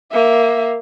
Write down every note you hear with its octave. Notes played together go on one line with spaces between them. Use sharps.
A#3 E5